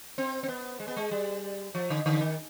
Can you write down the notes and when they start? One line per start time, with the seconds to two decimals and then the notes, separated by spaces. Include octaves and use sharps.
0.18 C4
0.43 C4
0.49 B3
0.80 G#3
0.88 B3
0.97 G#3
1.11 G3
1.75 F3
1.90 D3
2.06 D3
2.21 D#3